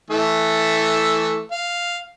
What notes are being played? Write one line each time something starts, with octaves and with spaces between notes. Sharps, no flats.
E3 A3 A4
F5